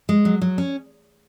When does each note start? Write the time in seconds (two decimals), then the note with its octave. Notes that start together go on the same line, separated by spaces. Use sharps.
0.09 G#3
0.25 F#3
0.42 F#3
0.58 C#4